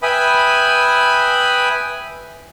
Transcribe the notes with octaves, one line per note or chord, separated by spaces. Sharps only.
B4 E5 G5 G#5 B5 D#6